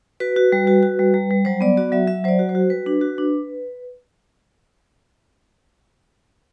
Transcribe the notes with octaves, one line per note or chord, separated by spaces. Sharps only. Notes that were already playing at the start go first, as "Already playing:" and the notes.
F#4 B4
F#4
G3
F#4
F#4
G3
G3
G3
F#3 C5
B3 D5
F#4 D5
F#3 E5
F#3 E5
F#3 C5 D5
F#4
C5
F#4
G3 B4
D4
F#4
D4